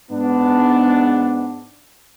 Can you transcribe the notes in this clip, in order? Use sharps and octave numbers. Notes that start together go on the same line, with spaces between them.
G#2 B3 D4